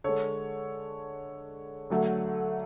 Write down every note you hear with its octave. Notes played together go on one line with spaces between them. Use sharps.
D3 G#3 A4 C#5
D3 F#3 A3